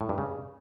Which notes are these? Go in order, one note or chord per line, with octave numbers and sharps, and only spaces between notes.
A2
G2
C#3